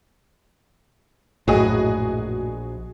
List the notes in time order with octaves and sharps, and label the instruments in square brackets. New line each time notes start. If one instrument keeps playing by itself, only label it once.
[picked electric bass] A#1 [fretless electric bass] F#2 A2 [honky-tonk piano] F#4 G#4 D#5